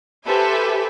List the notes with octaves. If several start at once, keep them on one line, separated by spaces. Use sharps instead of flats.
G4 A4 B4 C5 E5 G#5